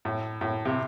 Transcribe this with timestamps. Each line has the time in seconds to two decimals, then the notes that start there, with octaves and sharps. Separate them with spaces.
0.05 A2
0.41 A2
0.65 C3